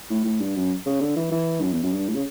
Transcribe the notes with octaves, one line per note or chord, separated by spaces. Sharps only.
A2
A2
G2
F#2
C#3
D3
E3
E3
F#2
E2
F#2
G2
A2
C#3